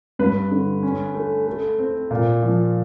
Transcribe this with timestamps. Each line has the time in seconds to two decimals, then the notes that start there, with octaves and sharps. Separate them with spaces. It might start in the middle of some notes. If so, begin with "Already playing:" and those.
0.19 G2 B4
0.51 D3
0.83 C#4
1.14 A3
1.47 A3
1.79 C4
2.11 A#2
2.42 F3